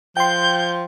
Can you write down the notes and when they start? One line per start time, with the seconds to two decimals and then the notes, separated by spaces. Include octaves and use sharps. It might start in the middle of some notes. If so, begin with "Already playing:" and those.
0.17 F3 G5 C6 G6